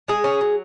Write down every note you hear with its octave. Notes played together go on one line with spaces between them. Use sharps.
G#3 G#4
C#4
F#3